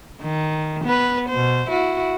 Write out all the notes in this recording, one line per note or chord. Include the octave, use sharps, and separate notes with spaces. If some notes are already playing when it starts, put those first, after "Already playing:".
D#3
B3 B4
B2 C5
E4 F#4